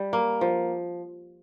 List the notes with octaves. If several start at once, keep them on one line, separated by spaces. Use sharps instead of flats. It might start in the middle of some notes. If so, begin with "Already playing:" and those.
Already playing: G3
A#3
F3